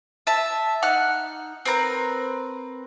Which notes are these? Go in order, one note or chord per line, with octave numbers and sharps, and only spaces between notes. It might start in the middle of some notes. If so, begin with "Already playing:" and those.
E5 A5
D#4 F#5 F6 F#6
C4 A#4 B4 A#5